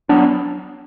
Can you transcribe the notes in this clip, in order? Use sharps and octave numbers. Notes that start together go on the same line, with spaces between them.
F#3 B3 D4